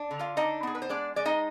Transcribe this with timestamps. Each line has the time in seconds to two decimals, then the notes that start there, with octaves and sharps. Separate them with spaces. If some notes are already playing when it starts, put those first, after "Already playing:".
Already playing: D4
0.11 D3
0.19 F4 F5
0.37 D4 D#4 D#5
0.63 B3 G#4
0.75 B4
0.82 C5
0.89 G#3 D4 D5
1.16 G#3 D5
1.25 D#4 D#5